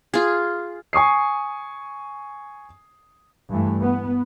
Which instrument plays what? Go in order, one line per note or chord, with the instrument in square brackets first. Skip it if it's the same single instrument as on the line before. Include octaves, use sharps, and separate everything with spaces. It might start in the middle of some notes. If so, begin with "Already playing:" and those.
[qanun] F4 G#4
[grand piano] G#5 C#6 D#6 C7
[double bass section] G2 E3 A3
B3